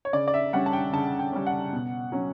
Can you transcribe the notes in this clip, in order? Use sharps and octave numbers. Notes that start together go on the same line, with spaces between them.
C#5
C#3 D5
D5
E5
G3 C#4 F#5
A5
G5
C#3 A5
G5
G3 C#4
F#5
B2
F#3 C#4